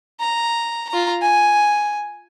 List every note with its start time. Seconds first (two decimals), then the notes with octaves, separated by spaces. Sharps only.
0.20 A#5
0.89 F4 A#5
1.22 G#5